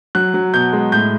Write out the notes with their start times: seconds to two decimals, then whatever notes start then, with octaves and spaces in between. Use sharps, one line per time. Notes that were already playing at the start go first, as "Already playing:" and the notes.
0.15 F#3 F#6
0.34 F#3
0.53 B2 G6
0.73 G#3
0.92 A2 G6